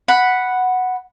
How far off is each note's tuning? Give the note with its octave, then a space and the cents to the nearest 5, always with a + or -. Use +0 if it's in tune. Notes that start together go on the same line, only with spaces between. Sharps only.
F#5 +0 B5 +0